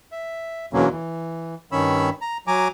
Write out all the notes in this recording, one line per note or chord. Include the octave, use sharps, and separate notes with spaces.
E5
E2 B2 D3 F#3 A#3 C#4
E3
G2 D#3 C#4 C#5 B5 E6
A#5
F#3 G#5 A#5 D6